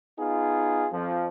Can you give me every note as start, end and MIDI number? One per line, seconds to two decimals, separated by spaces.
0.19 0.86 59
0.19 0.86 63
0.19 0.86 65
0.19 0.86 68
0.93 1.27 41
0.93 1.27 53